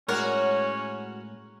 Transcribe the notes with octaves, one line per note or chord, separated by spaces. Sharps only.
A2 G#3 C#4 F#4 A#4 C#5 D5 F#5